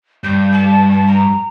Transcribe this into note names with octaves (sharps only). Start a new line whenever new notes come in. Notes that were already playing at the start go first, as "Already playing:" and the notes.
G2 G6
A5
A5
A#5